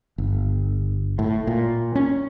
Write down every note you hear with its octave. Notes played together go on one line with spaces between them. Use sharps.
G1
A2
A#2
C#4